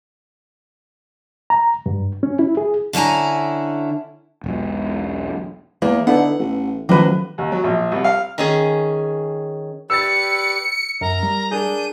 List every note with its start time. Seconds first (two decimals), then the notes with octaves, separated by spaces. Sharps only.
1.50 A#5
1.86 G2
2.23 C#4
2.39 E4
2.57 G#4
2.93 D3 C#4 E4 G#5 A#5
4.44 E1 B1
5.82 E2 A#3 B3
6.07 D3 B3 D#4 E4 F#5
6.39 A1
6.89 A1 D#3 F3 F#3 B4
7.38 D#2
7.52 F#3
7.64 A#1
7.92 C2
8.04 F5
8.38 D#3 C#4 G#4
9.90 G4 B4 D5 E6 A6 C#7
11.01 F#2 A#4 A#5
11.23 G3
11.51 D4 G#4 A#4 G6 D#7